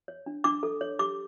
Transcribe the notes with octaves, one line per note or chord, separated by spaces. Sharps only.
C#5
D4
D4 D6
A4
C#5
G4 D6